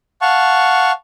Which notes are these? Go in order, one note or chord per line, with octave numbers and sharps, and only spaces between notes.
F5 F#5 A5 C#6